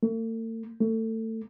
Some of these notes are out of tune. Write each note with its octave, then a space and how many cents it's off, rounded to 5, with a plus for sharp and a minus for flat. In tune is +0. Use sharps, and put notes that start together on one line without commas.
A3 +45
A3 +25